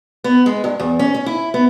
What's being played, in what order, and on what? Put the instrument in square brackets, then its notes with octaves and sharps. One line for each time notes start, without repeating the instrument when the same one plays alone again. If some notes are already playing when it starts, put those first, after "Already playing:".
[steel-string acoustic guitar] B3
G#3
G2
E2
C#4
C#4
E4
B3